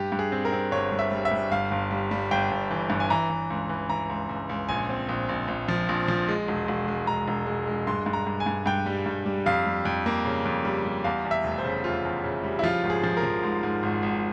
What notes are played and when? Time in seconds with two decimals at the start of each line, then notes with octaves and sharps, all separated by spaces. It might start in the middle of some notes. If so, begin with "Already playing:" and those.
Already playing: G2 G4
0.12 G2
0.19 G#4
0.32 C4
0.45 A#4
0.52 C4
0.71 G1 C#5
0.92 G1
0.99 E5
1.12 G3
1.25 E5
1.31 G3
1.51 G1 F5
1.71 G1
1.91 G3
2.11 G3
2.31 G1 G5
2.51 G1
2.71 E3
2.90 G2
3.00 G#5
3.10 E3 A#5
3.30 E3
3.50 C#2
3.69 E3
3.89 E3 A#5
4.09 C#2
4.29 C#2
4.49 C#2
4.69 A#1 G#5
4.89 C4
5.09 A#1
5.29 A#1
5.48 A#1
5.68 F3
5.89 A#1
6.08 F3
6.28 G#3
6.48 E1
6.68 E1
6.88 G#3
7.07 E1 A#5
7.28 E1
7.47 G#3
7.67 G#3
7.87 G2 C6
8.06 G2
8.13 A#5
8.27 G2
8.40 G#5
8.46 G2
8.66 G2 G5
8.86 G3
9.06 G2
9.26 G3
9.46 F2 F5
9.66 G3
9.85 F2
10.06 A#3
10.25 C#3
10.45 F2
10.65 G3
10.85 G3
11.04 E2 F5
11.25 E2
11.31 E5
11.44 F1
11.58 C5
11.64 C#3
11.84 E2 F4
12.05 E2
12.24 C#3
12.43 G3
12.59 E4
12.63 F3 F4
12.83 G#1
12.90 G#4
13.03 F3
13.17 A#4
13.23 F3
13.43 G#2
13.63 G#2
13.83 G#1
14.03 G#1